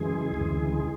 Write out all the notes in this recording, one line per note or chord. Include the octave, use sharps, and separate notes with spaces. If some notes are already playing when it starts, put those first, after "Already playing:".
Already playing: F#2 C#3 E3 G#3 G#4
D2 C#3 E3